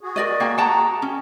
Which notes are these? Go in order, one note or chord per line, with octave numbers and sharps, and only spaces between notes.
F#4 G#4
A#4 D5 D#5
A#3 G5 G#5
F#5 G5 A5 A#5
C#4